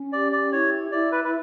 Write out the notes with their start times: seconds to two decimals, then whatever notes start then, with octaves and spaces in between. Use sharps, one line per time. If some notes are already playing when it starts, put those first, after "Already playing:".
Already playing: C#4
0.12 G4 D5
0.32 D5
0.52 E4 C#5
0.91 E4 D5
1.12 B4
1.24 B4